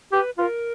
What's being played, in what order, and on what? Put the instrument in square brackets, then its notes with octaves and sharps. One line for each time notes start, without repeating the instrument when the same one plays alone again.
[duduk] G4 [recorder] B4
[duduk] F4 [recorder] B4
[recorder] A#4